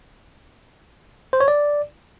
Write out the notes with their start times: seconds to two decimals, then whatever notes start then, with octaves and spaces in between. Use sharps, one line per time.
1.33 C5
1.40 C#5
1.48 D5